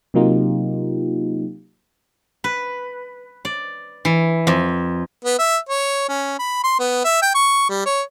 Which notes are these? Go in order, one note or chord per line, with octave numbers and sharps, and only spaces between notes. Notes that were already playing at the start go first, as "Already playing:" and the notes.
C3 F#3 A#3 D#4 F4 G4
B4
D5
E3
F2
B3
E5
C#5
C#4
B5
C6
B3
E5
G5
C#6
G3
C#5